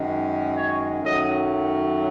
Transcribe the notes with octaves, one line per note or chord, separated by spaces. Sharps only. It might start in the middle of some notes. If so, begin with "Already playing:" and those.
Already playing: F#2 D#3 G#3
C#5
F#2 D#3 F#3 A3 D#5